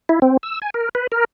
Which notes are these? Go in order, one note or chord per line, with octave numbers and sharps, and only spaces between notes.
E4
C4
E6
G#5
A#4
B4
A#4